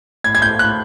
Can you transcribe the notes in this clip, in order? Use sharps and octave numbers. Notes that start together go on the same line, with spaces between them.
A2 G#6
G#6
A2 G6
A2 F#6